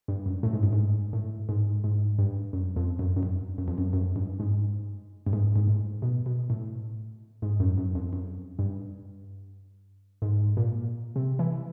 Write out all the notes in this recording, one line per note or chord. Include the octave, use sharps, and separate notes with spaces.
G2
F#2
A2
G#2
G2
G#2
A2
G#2
G#2
G2
F#2
F2
F#2
F#2
G2
F#2
F2
F#2
F#2
G2
G#2
G2
G#2
G#2
A2
B2
B2
A2
G#2
F#2
F#2
F2
F#2
G2
G#2
A#2
C3
E3